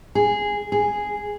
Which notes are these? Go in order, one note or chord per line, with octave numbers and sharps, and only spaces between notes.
G#4
G#4